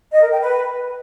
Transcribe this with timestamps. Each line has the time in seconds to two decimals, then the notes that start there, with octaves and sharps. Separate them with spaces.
0.11 D#5
0.21 A#4
0.31 G5
0.41 B4